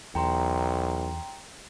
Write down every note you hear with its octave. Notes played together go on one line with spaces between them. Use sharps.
B1 E2 G5 A#5 C6